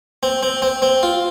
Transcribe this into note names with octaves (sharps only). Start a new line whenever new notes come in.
C4
C4
C4
C4
F4